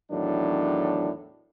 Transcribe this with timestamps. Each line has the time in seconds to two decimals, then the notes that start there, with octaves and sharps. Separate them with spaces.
0.11 E2 A2 D#3 F#3 D4